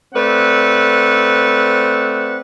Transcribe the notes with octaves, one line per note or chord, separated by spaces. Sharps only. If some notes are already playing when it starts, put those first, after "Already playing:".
A3 C4 B4 D5 F#5